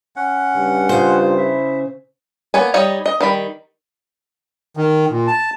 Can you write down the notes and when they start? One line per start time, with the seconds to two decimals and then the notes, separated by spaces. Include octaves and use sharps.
0.16 C#4 F#5
0.56 G2 C#3
0.89 C#3 F4 C5
1.37 E4 E5
2.54 A#3 B3 C#5 G#5
2.74 G3 D#4 C#5 D#5
3.06 D#5
3.21 D#3 G3 B5
4.77 D#3
5.10 A#2
5.27 A5